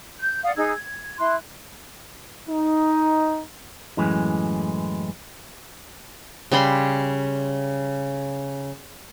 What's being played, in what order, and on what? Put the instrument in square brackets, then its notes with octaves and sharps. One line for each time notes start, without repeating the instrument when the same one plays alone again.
[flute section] G6
D5 F5 F#5 D#6
D#4 G#4 E6 G#6
G#6
E4 C6 F#6
[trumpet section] D#4
[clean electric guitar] F#2 A2 E3 G#3
[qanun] C#3 G3 B5 C6